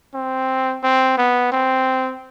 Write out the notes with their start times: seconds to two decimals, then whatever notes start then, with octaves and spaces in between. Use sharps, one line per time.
0.14 C4
0.83 C4
1.18 B3
1.52 C4